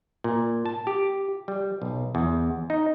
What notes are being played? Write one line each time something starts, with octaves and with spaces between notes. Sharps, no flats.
A#2
A5
G4
G3
B1
E2
D#4